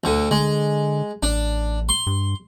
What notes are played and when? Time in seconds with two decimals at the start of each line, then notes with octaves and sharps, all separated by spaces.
0.04 D2 D3
0.31 D3 G#3
1.23 A1 D4
1.89 C6
2.07 G2